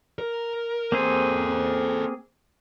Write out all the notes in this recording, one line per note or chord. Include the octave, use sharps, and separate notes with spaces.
A#4
A#3 C4 G#4 A4 C5